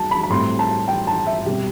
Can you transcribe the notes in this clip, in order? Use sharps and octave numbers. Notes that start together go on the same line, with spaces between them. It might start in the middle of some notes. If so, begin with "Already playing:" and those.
Already playing: G3 A5
B5
B5
A2 G3 C4 C6
A5
G5
A5
E5
B2 G3 C4 G4